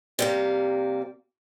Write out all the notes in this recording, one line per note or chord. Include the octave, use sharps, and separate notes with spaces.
C3 G3 A#3